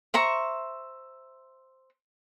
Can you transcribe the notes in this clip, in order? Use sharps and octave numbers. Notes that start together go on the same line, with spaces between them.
C5 E5 A#5 C#6